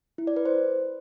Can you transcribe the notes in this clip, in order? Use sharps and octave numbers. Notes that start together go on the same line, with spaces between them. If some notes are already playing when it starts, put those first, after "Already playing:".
E4
D5
B4
C5